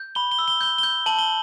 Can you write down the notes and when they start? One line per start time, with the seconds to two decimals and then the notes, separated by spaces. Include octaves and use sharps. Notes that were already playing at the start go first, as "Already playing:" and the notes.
Already playing: G6
0.15 B5 G7
0.32 G7
0.39 E6
0.48 G7
0.61 G6 G7
0.78 G6 G7
1.06 A5 F#7
1.19 G7